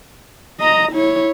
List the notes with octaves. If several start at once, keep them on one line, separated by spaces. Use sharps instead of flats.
D#5 A#5
E4 C#5